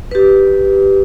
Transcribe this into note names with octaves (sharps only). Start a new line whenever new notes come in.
G4 B4